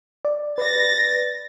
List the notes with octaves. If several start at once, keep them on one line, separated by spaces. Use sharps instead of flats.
D5
B4 D5 A6 A#6